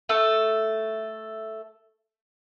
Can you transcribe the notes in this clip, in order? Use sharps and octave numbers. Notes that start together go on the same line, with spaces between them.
A3 A4